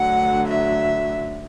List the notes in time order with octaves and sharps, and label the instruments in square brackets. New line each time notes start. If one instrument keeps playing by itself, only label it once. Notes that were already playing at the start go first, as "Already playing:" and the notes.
Already playing: [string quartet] D2 D3 F#3 F#5
E5